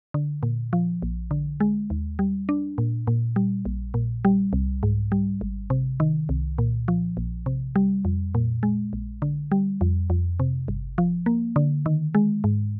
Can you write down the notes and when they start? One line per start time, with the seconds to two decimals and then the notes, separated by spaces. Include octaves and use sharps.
0.14 D3
0.43 A#2
0.73 F3
1.02 A#1
1.31 D3
1.60 G#3
1.90 D#2
2.19 G3
2.49 D4
2.78 A#2
3.07 A#2
3.36 G3
3.65 A#1
3.94 A#2
4.25 G3
4.53 C2
4.83 G#2
5.12 G3
5.41 G#1
5.70 C3
6.00 D#3
6.29 C2
6.58 A#2
6.88 F3
7.17 A#1
7.46 C3
7.76 G3
8.05 F2
8.35 A#2
8.63 G#3
8.93 A#1
9.22 D3
9.52 G3
9.81 F2
10.10 F2
10.40 C3
10.68 G1
10.98 F3
11.26 A#3
11.56 D3
11.86 D#3
12.15 G#3
12.44 G#2